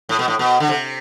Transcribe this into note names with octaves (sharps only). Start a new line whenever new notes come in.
A2
B2
A2
B2
D3
C3